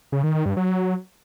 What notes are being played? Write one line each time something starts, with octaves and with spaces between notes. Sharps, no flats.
C#3
D#3
D#3
G2
F#3